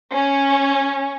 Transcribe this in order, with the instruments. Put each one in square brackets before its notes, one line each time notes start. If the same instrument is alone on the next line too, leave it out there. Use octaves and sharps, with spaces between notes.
[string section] C#4